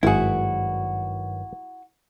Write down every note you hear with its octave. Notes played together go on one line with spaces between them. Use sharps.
G#1 G2 D#3 F#3 E4 F#4 G#4